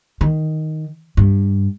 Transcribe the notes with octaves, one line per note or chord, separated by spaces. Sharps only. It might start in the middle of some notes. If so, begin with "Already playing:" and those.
D#3
G2